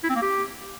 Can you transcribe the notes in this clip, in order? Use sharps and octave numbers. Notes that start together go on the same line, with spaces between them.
E4
C4
A#3
G4